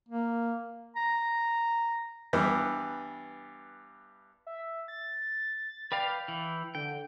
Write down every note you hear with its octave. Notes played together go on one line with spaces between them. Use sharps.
A#3
A#5
G2 E3 B3
E5
A6
B4 D5 F5 G5
E3
D3 G5